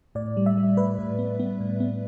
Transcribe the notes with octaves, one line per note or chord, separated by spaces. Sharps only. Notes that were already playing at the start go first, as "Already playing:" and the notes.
A2 D5
G3
E5
G3
A2 B4
A2
B3
B3
A2
B3